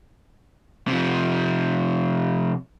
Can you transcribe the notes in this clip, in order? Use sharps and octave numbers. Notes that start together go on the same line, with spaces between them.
C3 F3